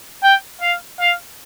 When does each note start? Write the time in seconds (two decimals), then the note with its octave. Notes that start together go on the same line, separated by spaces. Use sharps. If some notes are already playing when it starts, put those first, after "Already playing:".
0.23 G5
0.61 F5
1.00 F5